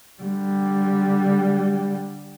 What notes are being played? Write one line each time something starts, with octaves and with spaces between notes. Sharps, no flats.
D3 G3